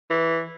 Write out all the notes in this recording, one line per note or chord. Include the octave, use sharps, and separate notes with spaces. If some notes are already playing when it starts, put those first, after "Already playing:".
E3